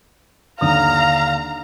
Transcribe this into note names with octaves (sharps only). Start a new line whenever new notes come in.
D#2 D3 F5 A#5 D#6